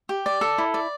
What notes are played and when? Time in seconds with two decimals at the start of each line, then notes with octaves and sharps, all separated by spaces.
0.09 G4
0.26 D5
0.41 A4
0.58 E4
0.74 D5